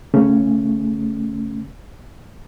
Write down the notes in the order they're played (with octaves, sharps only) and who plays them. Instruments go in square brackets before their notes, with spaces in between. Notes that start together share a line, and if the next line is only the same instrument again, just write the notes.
[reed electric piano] C#3 A3 C#4